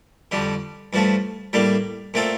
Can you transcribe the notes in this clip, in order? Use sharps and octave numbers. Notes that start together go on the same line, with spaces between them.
F2 D3 G3
G2 F3 A3
A2 G3 A#3 D4
A#2 A3 C4 F4 A4